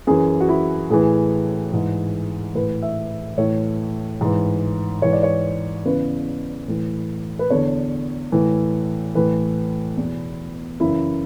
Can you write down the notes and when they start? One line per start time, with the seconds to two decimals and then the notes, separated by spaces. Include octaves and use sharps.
0.07 F#2 E3 G#4
0.40 F#4
0.49 E4
0.90 A2 E3 G#4
1.72 G#2 E3
2.55 A2 E3 B4
2.82 E5
3.38 A2 E3 C#5
4.21 G#2 E3
5.02 G#2 E3 C#5
5.13 D5
5.23 C#5
5.85 E2 C#3 E3 B4
6.68 A2 E3
7.39 B4
7.50 E2 D3 C#5
8.32 A2 E3
9.15 A2 E3 B4
9.97 E2 B2
10.80 F#2 C#3 E3 E4